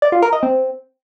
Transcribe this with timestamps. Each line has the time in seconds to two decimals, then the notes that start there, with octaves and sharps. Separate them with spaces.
0.02 D5
0.12 F4
0.22 A#4
0.33 D#5
0.43 C4